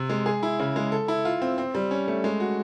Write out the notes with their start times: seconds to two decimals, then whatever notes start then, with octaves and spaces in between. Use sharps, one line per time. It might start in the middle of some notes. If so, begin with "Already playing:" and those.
Already playing: C3
0.09 G#3
0.26 G#4
0.43 E4
0.59 C#3
0.76 G#3
0.92 A4
1.08 E4
1.25 F4
1.42 C4
1.58 C4
1.75 G3
1.91 C#4
2.08 A3
2.24 G#3
2.40 F#4